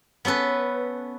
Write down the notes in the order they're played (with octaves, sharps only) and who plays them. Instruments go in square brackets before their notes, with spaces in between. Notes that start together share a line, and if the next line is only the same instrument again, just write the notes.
[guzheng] B3 C#4 A4 B4